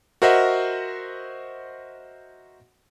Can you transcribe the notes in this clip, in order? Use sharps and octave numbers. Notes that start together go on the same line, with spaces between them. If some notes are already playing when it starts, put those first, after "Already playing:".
F#4 A#4 C5 D#5 E5 F#5